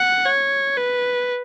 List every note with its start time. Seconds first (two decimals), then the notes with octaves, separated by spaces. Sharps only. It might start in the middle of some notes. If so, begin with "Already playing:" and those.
Already playing: F#5
0.25 C#5
0.77 B4